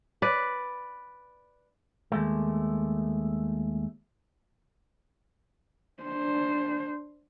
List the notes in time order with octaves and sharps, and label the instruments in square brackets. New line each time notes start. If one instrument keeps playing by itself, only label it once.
[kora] B4 D5
[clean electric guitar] D#2 G#3 A3
[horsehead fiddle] D4 C5